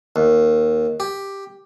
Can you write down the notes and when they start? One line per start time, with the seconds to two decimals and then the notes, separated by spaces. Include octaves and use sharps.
0.16 D#2
1.00 G4